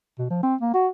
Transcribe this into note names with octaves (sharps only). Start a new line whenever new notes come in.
B2
F3
C4
A#3
F#4